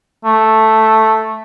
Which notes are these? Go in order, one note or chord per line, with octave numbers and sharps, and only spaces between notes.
A3